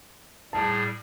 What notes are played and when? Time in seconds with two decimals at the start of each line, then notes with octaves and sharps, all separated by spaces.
0.53 A2 G3 G#4 A5